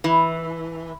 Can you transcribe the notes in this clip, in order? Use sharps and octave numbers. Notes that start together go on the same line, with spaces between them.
E3